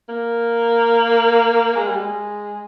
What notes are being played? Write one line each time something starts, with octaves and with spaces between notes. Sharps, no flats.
A#3
G#3
G3
G#3